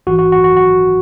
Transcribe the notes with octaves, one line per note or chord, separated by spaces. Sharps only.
A1 G#2 E3 F#4
F#4
F#4
F#4
F#4